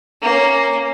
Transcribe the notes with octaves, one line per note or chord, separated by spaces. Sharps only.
A#3 C#4